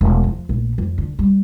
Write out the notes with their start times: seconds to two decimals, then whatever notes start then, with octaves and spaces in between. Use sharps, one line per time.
0.01 E1
0.24 F3
0.49 A#1
0.78 F2
0.98 D3
1.19 G3